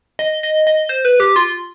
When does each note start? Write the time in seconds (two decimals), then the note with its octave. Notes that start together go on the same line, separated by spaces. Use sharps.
0.19 D#5
0.43 D#5
0.67 D#5
0.89 C5
1.05 B4
1.20 G4
1.36 F4